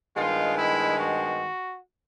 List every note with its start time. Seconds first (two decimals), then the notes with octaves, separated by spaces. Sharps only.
0.16 G2 D#3 G#3 B3 F4
0.57 E4
0.99 F#4